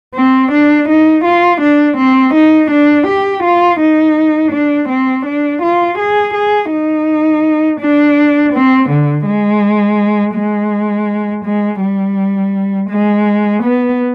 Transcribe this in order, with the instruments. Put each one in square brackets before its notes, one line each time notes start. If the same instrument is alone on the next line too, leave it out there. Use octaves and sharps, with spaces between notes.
[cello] C4
D4
D#4
F4
D4
C4
D#4
D4
G4
F4
D#4
D4
C4
D4
F4
G#4
G#4
D#4
D4
C4
D3
G#3
G#3
G#3
G3
G#3
B3